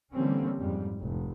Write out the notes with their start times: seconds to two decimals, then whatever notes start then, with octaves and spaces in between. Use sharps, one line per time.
0.14 D3 E3 G3 A#3 C4 C#4
0.58 F2 G#2 G3
0.99 F1 C2